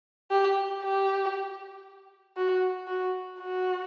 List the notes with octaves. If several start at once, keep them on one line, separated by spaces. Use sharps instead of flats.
G4
G4
F#4
F#4
F#4